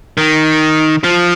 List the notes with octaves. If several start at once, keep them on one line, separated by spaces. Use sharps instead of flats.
D#3
F3